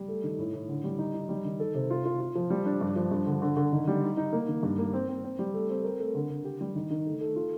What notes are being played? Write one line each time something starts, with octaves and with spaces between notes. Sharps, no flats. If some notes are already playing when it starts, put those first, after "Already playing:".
Already playing: G3
A3
D#3
A2
A2
D3
G3
D#4
D#4
G3
D#3
A4
C3
F4
F4
F4
F3
G3
D4
G2
F3
G2
D3
D3
D3
D#3
G3
D#4
D#4
A#3
D#3
G2
A#3
C4
C4
C4
G3
A3
C4
A#4
A3
D3
D3
G4
G3
D#3
D#3
A3
A3
F4